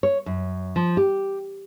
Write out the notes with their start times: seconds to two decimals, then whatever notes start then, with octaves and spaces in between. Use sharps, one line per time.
0.03 C#5
0.26 F#2
0.76 F3
0.97 G4